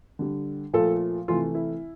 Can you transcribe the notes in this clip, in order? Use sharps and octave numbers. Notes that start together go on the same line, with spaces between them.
D3 G3
A#2 F3 A3 A4
C3 E3 A3 F4
E4